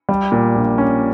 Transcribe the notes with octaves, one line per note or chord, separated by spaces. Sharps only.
G3
A#2
A#1
C#4